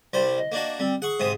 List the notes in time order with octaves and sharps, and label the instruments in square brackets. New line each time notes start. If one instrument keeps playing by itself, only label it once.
[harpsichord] C2 G3 C5
[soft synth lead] D#5
[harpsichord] A#3 D4 F#4
[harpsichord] G3 [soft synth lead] C4
[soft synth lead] G#4 [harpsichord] F#5 C#6
[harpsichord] G#2 C3 D#6